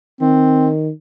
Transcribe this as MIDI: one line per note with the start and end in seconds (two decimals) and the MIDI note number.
0.21 0.90 51
0.21 0.69 60